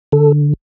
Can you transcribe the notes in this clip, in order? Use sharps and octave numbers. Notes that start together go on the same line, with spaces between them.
D3 A4